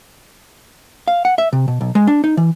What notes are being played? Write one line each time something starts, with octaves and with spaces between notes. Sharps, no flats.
F5
F#5
E5
C3
B2
B1
G#3
D4
D#4
E3